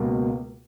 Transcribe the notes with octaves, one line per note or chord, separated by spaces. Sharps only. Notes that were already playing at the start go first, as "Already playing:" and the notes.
Already playing: C#2 B2 A#3